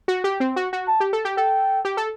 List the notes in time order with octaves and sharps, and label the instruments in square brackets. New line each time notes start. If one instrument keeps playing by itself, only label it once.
[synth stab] F#4
G4
C4
F#4
F#4
[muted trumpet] A5
[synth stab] G4
A4
G4
[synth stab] A4 [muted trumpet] G5
[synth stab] G4
A4